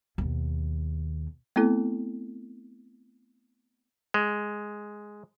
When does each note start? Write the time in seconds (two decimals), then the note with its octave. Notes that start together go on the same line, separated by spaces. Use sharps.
0.18 D#2 B2
1.56 A3 B3 C4 E4 A4
4.14 G#3